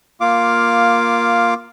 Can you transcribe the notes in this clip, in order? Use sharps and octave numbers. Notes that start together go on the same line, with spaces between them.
A#3 F4 F5 D6